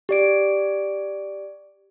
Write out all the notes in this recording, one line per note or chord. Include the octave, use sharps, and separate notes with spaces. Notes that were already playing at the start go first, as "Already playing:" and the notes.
G4 D5 D7